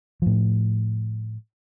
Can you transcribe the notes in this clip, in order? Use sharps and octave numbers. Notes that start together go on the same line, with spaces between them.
A2 F3